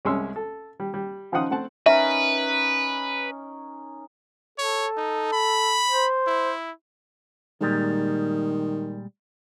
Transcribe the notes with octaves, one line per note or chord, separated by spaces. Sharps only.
C2 G#3 C#4 C6 E6
A4
G3
G3
C#3 F3 D#4 F4 F#5 D#6
A3 C4 F#5 A5
C#4 D#4 A#4 B4 E5
A4 C#5
D#4
B5
C5
E4
A#2 D#3 G3 G#3